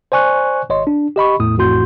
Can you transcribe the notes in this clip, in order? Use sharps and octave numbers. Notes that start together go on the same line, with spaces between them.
C5 D5 G#5 C#6 F#6
G#1 C#5 D#5 C6
D4
G4 D#5 B5 C#6
E2 A2 D#6
A1 F2 A2 F#4 C6 G6